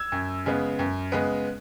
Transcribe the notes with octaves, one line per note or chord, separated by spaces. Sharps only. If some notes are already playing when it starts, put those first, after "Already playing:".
Already playing: E6 G#6
F#2
C#3 G#3 B3
F#2
C#3 G#3 B3